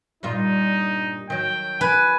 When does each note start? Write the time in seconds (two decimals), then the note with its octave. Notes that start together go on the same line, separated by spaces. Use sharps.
0.23 G2 A#2 D#4 F4
1.30 D#3 F#3 G5
1.81 B4 G#5